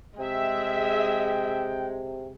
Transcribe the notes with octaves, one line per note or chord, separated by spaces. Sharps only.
C3 G#3 G#4 E5 G5